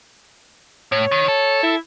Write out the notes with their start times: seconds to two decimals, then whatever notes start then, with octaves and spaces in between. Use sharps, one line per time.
0.92 A2 C#5
1.12 D#3
1.28 A4
1.63 E4